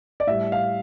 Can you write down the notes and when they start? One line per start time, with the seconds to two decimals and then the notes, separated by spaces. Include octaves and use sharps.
0.20 D5
0.27 A2 G3 E5
0.52 F5